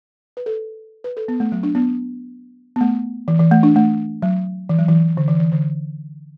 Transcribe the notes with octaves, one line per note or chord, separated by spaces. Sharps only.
B4
A4
B4
A4
B3
A3
F#3
D4
B3
B3
A3
E3
E3
A3
D4
A3
F#3
E3
F#3
E3
D3
E3
E3
D3